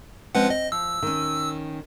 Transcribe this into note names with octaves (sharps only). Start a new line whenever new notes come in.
F3 G#3 C4 C#4 B4 F#5
C4 D#5
F3 E6
D#3 C#4